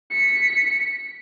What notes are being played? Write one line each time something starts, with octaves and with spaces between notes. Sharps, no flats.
B6 C#7